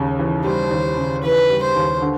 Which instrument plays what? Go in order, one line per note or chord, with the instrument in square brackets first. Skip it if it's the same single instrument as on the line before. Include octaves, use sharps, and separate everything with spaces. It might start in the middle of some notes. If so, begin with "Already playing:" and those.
Already playing: [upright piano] D#2 C#3 G3
E3
[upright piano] G3 [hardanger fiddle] C5
[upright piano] D#2
C#3
[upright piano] E3 [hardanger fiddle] B4
[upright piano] G3
[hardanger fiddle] C5
[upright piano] D#2
D3